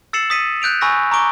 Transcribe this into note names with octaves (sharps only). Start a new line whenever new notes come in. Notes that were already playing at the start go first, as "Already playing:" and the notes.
E6 A6 C7 C#7 E7 F#7
D#6 A6 B6 C#7 D#7
F#6 G6 D7 F7
G#5 B5 C#6 E6 F#6 A#6
A#5 C#6 D6 D7 G7